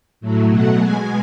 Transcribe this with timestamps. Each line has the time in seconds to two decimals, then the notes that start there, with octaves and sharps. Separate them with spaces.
0.21 A2 F#3 A3
0.48 B2 F#3 A3 F#5
0.77 B2 G#3 G#5